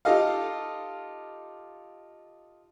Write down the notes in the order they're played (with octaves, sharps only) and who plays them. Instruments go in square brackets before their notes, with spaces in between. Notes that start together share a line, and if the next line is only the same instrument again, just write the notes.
[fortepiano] D#4 F4 G4 A4 D#5 F5